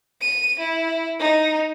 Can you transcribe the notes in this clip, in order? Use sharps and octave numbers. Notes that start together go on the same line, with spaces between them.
D#7
E4
D#4